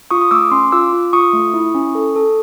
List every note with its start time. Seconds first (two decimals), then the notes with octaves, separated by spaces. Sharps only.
0.11 F4 C#6 D#6
0.22 D#6
0.31 A3 D6 E6
0.51 C#4 C6 D6
0.72 F4 D6 E6
0.93 F4
1.13 F4 C#6 D#6
1.33 A3
1.54 E4
1.75 C#4
1.95 A4
2.16 A4